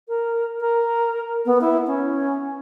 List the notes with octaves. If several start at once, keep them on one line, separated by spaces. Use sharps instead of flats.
A#4
A#4
B3
E4
C#4